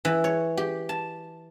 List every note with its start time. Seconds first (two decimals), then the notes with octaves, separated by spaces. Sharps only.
0.05 E3
0.24 C#5
0.57 G4
0.89 A5